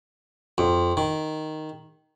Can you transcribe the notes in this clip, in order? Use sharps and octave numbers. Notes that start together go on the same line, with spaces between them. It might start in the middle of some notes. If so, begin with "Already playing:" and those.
F2
D#3